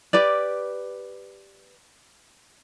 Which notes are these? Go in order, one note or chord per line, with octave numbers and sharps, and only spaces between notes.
G4 B4 D5